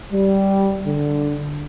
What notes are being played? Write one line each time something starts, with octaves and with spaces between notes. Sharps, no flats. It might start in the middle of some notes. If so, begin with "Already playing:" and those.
G3
D3